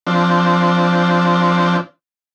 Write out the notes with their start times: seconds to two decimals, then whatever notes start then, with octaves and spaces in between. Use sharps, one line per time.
0.07 F3 C4 D4